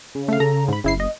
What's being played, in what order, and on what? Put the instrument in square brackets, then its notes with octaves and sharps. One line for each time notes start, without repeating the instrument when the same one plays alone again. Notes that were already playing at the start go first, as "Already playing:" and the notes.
[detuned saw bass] C#3
[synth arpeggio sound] A3 F5
[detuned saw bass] C#3 [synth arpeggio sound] A4 A#5
[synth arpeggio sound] G#2 B5
[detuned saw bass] F#1 [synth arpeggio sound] C#3 E4 C7
[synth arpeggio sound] D#5